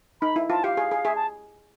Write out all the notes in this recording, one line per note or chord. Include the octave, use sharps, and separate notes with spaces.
D#4 B5
E4
F4 A5
G4 F5
G#4
G#4
G#4 E5
A5